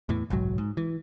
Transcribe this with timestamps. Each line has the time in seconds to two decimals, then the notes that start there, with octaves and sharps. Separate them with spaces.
0.09 E2 A2 E3
0.30 F#1 B1 G#2 F#3
0.58 G#2
0.77 E3